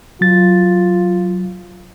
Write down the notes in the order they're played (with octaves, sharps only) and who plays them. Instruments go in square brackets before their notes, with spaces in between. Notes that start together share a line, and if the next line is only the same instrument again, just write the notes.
[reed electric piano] F#3 A6 [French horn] F4